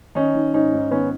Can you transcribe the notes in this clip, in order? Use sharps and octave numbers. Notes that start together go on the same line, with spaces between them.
D#3 C#4 D#4
D#3
G#2 C#4 D#4
G#2
D#3 B3 C#4